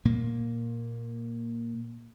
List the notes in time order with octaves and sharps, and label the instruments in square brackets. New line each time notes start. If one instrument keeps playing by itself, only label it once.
[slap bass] A#2 A#3